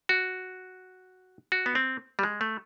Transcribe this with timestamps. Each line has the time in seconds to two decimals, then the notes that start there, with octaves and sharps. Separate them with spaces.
0.09 F#4
1.52 F#4
1.66 B3
1.75 C4
2.19 G3
2.23 G#3
2.41 A3